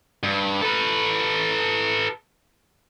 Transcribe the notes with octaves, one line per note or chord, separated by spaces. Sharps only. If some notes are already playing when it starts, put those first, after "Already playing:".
G2
A4 B4